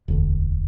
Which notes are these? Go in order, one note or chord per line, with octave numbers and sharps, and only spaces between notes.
E1 D2 D3